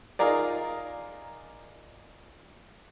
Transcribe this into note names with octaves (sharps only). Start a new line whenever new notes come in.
D#4 F4 G#4 A#4 D5